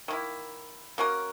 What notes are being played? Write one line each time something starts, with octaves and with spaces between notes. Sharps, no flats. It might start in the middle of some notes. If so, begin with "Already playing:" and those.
D#3 A#3 E4
A#3 C#4 F#4 A#4